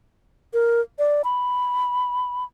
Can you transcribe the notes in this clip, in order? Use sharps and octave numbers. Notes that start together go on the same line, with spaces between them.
A#4
D5
B5